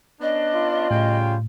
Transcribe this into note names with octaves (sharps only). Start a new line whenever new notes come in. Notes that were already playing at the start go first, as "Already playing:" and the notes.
B3 C#4 D4 D#5
F4
A2 C#3 G3 G5